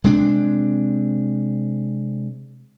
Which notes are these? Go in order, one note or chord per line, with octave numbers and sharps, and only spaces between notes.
C3 G#3 C4 D4